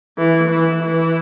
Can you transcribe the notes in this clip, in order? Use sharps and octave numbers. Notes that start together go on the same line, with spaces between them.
E3
E3
E3